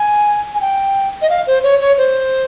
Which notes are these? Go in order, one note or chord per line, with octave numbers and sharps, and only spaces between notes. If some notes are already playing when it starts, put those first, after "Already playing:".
Already playing: G#5
G#5
G5
D#5
F5
C5
C#5
C#5
C5